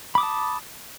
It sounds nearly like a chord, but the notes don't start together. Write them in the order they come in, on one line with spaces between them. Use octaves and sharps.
B5 D6 D#6 A5